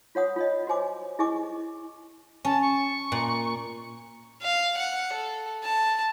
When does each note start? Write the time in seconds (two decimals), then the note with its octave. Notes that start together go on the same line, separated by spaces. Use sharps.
0.15 F4 C#5 F#5 D#6
0.36 F4 C#5 D#5
0.67 F#4 C5 G#5 D6
1.19 E4 G#4 D#5 G#5 C#6 D6
2.45 C#4 A5
2.61 C#6
3.12 A#2
4.42 F5
4.77 F#5
5.12 A4
5.63 A5